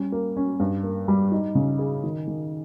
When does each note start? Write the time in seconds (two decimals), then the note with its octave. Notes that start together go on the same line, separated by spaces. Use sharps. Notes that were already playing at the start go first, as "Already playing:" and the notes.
Already playing: G3 C#4
0.12 A#3
0.36 C#4
0.60 G2
0.84 A#3
1.08 G3
1.32 D#4
1.55 C#3
1.79 G#4
2.04 D#3
2.28 D#3